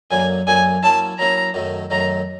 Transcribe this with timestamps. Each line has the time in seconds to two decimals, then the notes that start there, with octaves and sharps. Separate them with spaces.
0.11 F#2 D3 F#3 A#3 G#5
0.47 F#2 D3 F#3 A#3 G#5
0.83 F#3 A#3 C#4 E4 A5
1.19 F#3 A#3 C#4 E4 A#5
1.54 F#2 D#3 F#3 A3
1.90 F#2 D#3 F#3 A3 A#5